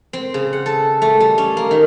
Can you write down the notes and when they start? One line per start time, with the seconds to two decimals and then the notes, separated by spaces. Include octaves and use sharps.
0.13 C4
0.34 C#3
0.53 F#5
0.66 A4
1.02 A3
1.20 G3
1.38 C#4
1.57 A#3
1.71 D#3